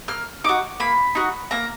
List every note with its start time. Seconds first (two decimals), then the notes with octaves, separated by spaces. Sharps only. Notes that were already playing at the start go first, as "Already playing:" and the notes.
0.08 A#3 F6
0.44 D#4 F#4 D6
0.80 A#3 B5
1.15 D#4 F#4
1.51 A#3 A#5